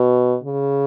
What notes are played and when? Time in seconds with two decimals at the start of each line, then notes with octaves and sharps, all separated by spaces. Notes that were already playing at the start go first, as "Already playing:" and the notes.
Already playing: B2
0.44 C#3